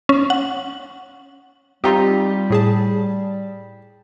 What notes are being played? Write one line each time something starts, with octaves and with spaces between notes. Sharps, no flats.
C#4
F#5
G3 C4 D#4 F4 G4
A2 G#4 A5